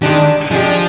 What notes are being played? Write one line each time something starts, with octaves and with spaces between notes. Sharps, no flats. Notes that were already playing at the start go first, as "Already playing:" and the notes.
D#3 G#3 D4 G4
F3 G#3 D4 G4